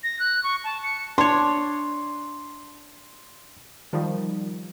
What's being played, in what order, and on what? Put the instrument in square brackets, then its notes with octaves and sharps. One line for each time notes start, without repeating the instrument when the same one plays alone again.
[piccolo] A#6
F#6
C#6
A5
C#7
[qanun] D4 C#5 [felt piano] C6
[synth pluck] D#3 F3 G3